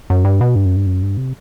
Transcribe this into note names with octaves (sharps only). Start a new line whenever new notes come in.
F#2
G2
B2
G2
F#2
G2
F#2
G2
C3